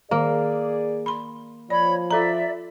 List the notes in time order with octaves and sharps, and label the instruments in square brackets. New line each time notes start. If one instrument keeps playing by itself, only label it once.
[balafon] D#3 [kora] A#3 [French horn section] G#4 D5
[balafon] B5 C6
[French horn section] F3 [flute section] C#5 B5 [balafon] D5
[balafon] F4 A4 A#5 [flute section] D5 E5